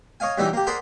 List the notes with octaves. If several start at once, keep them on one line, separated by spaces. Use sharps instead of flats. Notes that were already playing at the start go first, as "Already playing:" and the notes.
C#5 D#5 F5 G#5
F#2 A#2 E3 G3 D#4 E4
A#3 G4
G#4 A#4 C5 D5 F#5 B5